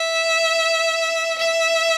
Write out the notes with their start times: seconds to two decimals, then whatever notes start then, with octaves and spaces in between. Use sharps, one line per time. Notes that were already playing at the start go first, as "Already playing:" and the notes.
Already playing: E5
1.38 E5